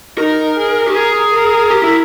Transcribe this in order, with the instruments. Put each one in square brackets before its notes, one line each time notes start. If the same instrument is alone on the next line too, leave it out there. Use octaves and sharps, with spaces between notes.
[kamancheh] D#4 [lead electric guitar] A#4
[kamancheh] G#4
[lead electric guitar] G4
[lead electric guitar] G#4 [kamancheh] A#4
[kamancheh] A#4
[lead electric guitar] G4
E4